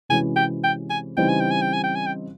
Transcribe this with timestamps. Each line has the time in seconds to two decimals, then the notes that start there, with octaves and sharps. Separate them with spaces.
0.09 C3 E3 G#3 C#4 F#4 G#5
0.36 G5
0.64 G5
0.90 G#5
1.17 C#3 E3 G3 C4 D#4 G5
1.29 G#5
1.40 G5
1.51 G#5
1.62 G5
1.73 G#5
1.84 G5
1.95 G#5
2.06 G5